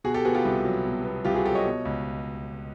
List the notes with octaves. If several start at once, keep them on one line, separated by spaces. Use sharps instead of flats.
B2 F#4 G#4
G4 A4
B3 F#4 G#4
F4 G4
C2
F#3
B2
B3
C2 F4 G4
F#4 G#4
F#3 G4 A4
C#5 D#5
B2
C#2